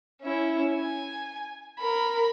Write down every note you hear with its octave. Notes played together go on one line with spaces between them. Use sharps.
C#4 E4
G#5
A#4 B5